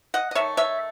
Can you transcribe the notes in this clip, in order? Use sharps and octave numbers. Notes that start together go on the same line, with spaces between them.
D#5 F#5
D#5
D#3 A3 C#5 E5
C#5 E5